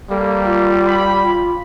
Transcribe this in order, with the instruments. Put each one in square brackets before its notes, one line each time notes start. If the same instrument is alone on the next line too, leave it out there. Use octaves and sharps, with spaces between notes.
[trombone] G3 [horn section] A#3 [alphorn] A4
[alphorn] F4
[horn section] B5
[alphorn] F4